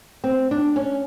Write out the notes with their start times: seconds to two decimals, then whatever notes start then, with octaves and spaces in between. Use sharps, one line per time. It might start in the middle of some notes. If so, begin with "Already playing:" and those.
0.24 C4
0.51 D4
0.76 C#4